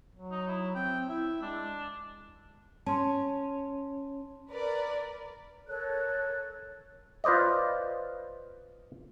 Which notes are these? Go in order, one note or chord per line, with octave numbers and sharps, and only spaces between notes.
F#3
D#4
E4
C4 G5
E4 E5
G#3 D4
C#4 A5 C6
A#4 B4 D5
A4 A#4 C#5 F#6
F4 B4 C5 D5 D#5